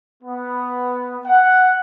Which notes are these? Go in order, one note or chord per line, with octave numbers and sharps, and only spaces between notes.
B3
F#5